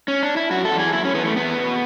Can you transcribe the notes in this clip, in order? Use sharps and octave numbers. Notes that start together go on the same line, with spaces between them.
C#4
D4
E4
F#2 F#4
A4
E3
G#4
F#2 E4
C#4
E3 B3
A3
E2 B3
B2